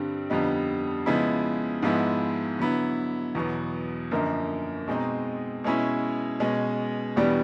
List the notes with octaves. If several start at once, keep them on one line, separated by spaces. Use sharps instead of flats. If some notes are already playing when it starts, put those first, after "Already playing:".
Already playing: G2 D3 G3 C4
F2 D3 G3 B3 D#4
C#3 F3 G#3 B3 E4
G#2 F3 G#3 B3 E4
D3 F#3 B3 E4
E2 B2 F#3 B3
F#2 D3 F3 A#3 D#4
B2 G#3 C4 D#4
B2 G#3 C#4 E4
B2 G#3 C#4
E2 B2 G3 B3 D4